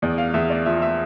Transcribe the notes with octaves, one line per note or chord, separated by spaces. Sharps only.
E2 D5
F5
E2 E5
D5
F3 E5
E5